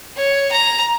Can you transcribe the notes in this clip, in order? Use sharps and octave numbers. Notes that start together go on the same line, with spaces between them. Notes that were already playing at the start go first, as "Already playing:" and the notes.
C#5
A#5